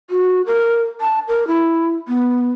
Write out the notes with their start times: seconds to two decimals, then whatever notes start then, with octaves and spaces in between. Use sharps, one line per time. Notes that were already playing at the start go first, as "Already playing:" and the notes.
0.10 F#4
0.46 A#4
1.01 A5
1.28 A#4
1.47 E4
2.08 B3